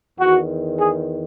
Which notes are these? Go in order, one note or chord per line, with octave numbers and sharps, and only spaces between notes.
E2 D#3 F#4
G#4